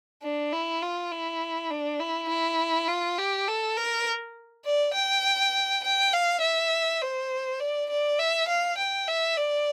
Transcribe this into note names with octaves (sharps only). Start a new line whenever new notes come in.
D4
E4
F4
E4
D4
E4
E4
F4
G4
A4
A#4
D5
G5
G5
F5
E5
C5
D5
D5
E5
F5
G5
E5
D5